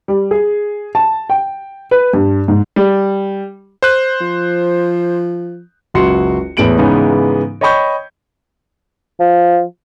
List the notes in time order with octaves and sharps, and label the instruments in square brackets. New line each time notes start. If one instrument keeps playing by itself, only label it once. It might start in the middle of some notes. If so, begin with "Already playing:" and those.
[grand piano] G3
G#4
A5
G5
B4
G2
G#2
[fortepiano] G3
[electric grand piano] C5 F#6
[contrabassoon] F3
[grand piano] F#1 C#2 F#4 C6 C#7
E2 A2 G#3 B3 D7 F#7
G#2 C#3 E3 G#3 B3 D#4
C#5 D#5 G5 B5 C#6 G6
[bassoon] F3